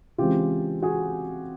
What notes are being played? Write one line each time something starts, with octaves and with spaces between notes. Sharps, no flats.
C#3 E3 G#3 C4 F4 G4
F#4 G#4